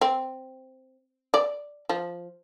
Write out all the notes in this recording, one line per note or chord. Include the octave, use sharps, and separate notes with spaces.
C4
D5
F3